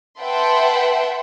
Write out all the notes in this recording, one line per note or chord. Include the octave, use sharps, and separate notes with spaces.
B4 E5 F#5 G5 A5 C6